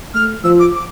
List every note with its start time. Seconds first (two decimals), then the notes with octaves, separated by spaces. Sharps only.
0.14 A3 F6
0.44 F3 E6
0.59 D6
0.75 D6